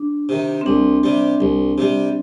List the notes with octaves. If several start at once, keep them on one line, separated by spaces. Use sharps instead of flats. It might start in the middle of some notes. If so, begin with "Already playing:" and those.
Already playing: D4
C3 D#3
C4
C2 D4
C3 G3
C2
C3 G3